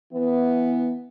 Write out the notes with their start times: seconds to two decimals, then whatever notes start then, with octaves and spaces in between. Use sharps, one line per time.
0.13 E3 B3